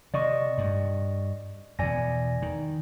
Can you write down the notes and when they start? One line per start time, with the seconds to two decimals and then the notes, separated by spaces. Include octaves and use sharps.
0.14 C3 D5 D#5 C#6
0.58 G2
1.79 E2 B2 D5 G#5 A#6
2.42 D#3